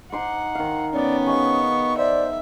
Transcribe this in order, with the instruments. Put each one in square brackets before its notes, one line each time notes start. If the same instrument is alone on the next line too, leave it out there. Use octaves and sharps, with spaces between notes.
[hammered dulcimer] D#4 C6 D6 [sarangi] F#5
[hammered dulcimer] D#3 F5
[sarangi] B3 [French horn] C#4 [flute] D5
[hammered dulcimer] G#4 D#5 F5 [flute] C#6
[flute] C5 [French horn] D5 [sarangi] E5